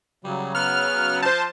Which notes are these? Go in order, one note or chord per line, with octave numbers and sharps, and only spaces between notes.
C#3 F#3 G3
B3 F6 F#6
F3 C5 A5 G6